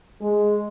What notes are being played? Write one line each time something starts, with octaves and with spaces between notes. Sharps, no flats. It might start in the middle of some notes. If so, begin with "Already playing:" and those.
G#3